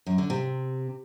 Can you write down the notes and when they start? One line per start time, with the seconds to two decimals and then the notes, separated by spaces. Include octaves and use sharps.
0.06 F#2
0.18 D3
0.30 C3